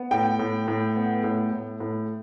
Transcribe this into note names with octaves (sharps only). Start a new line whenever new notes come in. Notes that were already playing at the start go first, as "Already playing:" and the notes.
Already playing: B3
A2 G5
A2
A2
B3
A2
A2
A2